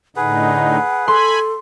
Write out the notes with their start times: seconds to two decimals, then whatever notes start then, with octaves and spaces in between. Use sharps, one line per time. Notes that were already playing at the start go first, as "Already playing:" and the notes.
0.16 A2 D3 D#4 G#4 B4 F#5
1.08 A4 G#5 B5 C6